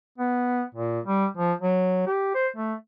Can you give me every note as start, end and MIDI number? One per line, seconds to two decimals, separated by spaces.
0.18 0.63 59
0.75 1.00 46
1.05 1.27 55
1.37 1.53 53
1.62 2.02 54
2.07 2.30 67
2.35 2.48 72
2.56 2.74 57